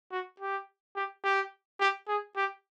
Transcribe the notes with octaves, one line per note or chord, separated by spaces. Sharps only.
F#4
G4
G4
G4
G4
G#4
G4